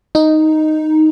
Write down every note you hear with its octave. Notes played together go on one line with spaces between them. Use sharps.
D#4